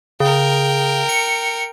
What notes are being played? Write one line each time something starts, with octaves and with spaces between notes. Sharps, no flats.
C#3 A#4 G5
C#7